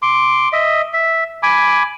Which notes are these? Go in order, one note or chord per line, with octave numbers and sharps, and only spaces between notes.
C6 D6
D#5 E5
E5
G#5 B5 D6